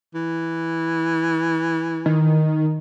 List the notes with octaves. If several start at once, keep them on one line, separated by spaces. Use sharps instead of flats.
E3
D#3